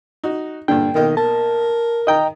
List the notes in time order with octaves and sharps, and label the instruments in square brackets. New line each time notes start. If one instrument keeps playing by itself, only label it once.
[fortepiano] D#4 F#4
[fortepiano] G2 A#2 D3 [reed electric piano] G5
[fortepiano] B1 A#3 D#5 [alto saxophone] D#3
[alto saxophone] A#4 [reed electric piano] A5
[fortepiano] D#3 D#6 [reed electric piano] D#5 G5 A#5